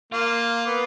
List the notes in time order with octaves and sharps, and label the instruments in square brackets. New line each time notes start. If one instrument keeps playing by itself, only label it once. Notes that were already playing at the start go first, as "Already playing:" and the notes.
[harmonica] A#3 [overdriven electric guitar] F4
[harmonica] B3